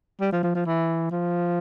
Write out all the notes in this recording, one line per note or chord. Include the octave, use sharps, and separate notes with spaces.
G3
F3
F3
F3
E3
F3